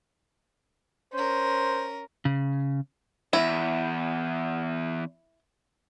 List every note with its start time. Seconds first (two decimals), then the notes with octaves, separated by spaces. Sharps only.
1.14 C#4 A#4 C5
2.25 C#3
3.33 E2 E4